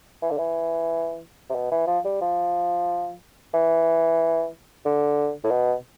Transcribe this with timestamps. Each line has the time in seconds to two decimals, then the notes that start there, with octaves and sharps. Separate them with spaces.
0.22 E3
0.31 D3
0.38 E3
1.49 C3
1.55 B2
1.71 E3
1.87 F3
2.05 G3
2.21 F3
3.54 E3
4.85 D3
5.44 A2
5.51 B2